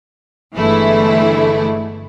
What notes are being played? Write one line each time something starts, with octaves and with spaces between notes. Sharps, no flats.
G1 D3 E3 G#3 A3 E4